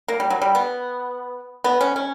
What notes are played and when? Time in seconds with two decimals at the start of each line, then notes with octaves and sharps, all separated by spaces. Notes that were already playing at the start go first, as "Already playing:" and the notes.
0.08 A#3
0.20 G3
0.30 F#3
0.42 G3
0.55 B3
1.64 B3
1.81 C#4
1.96 C#4